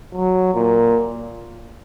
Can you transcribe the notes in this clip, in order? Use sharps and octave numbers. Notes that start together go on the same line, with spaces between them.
F#3
A#2